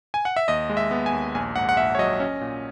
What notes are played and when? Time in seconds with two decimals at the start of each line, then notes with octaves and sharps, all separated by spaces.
0.14 G#5
0.25 F#5
0.36 E5
0.48 D#2 D#5
0.70 G#3
0.77 E5
0.91 B3
1.06 G#5
1.13 D#2
1.35 A#1 G#5
1.56 G#2 F#5
1.69 F#5
1.77 A#1 E5
1.95 C#5
1.98 F#3 D#5
2.20 C#4
2.41 A#2